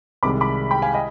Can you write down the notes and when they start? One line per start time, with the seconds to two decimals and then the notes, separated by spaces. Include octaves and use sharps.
0.23 C2 C3 D#3 G#3 B5 D6
0.41 B5 D6
0.71 G5 B5
0.82 F5 G#5
0.94 D#5 G5